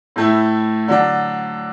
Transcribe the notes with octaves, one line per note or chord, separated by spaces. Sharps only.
A2 A3 E4
D3 F#3 D4